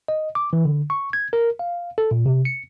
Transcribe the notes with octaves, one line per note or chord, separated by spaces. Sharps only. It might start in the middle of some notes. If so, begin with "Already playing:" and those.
D#5
D6
E3
D3
C#6
G#6
A#4
F5
A4
A#2
C3
C#7